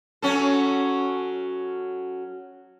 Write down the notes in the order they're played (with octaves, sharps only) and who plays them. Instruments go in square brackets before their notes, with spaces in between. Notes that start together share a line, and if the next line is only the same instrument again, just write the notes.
[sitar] F#3 C#4 A4